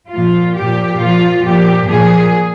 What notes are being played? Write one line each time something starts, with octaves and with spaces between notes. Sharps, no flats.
A#2 F3 F4
A#2 F3 G4
A#2 F3 F4
A#2 F3 G4
A#2 F3 G#4